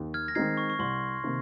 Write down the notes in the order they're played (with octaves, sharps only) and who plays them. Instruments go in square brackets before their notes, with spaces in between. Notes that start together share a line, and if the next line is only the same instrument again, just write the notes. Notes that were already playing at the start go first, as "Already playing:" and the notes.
Already playing: [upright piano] D#2
[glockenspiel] F6 G#6
A#6
[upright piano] D#3 G#3 C4 D#4 [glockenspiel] G#6 C7
[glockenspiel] C#6
C#6
[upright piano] C2 [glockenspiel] C6
[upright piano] C3 D#3 A#3